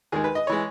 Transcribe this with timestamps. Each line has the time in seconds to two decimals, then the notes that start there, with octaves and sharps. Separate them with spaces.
0.12 D#2 D#3 G#3 G#4
0.24 B4
0.35 D#5
0.47 E3 G#3 C#5